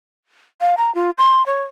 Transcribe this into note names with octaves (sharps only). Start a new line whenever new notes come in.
F5
A#5
F4
C6
C#5